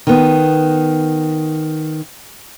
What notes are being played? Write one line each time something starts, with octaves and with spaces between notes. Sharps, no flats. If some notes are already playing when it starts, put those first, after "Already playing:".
D#3 B3